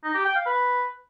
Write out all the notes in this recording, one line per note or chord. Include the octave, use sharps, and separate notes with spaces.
D#4
G4
G5
F5
B4